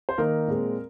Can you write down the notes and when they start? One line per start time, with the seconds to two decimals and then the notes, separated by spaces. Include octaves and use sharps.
0.09 C5
0.18 D#3 A#3 D#4 A#4
0.48 A#2 G#3 C4